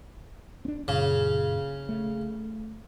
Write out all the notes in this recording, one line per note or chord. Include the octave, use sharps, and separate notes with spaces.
C4 D4
F#2 A#2 C#3
A3